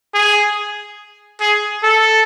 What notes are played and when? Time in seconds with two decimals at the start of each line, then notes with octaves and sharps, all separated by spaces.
0.14 G#4
1.41 G#4
1.83 A4